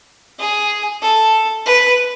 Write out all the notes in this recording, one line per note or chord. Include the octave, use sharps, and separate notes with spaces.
G#4
A4
B4